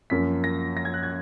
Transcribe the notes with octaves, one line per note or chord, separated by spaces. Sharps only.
F#2 F3 A#3 B6
A#6
A#6
G#6
F#6
G#6